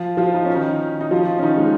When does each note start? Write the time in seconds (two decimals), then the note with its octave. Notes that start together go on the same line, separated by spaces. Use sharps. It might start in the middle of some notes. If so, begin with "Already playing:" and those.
Already playing: F3 F4
0.17 F3 F4
0.34 D#4
0.45 C#4
0.55 D#3 D#4
1.01 D#4
1.11 F3 F4
1.38 C#4
1.42 D#3 D#4
1.57 G#3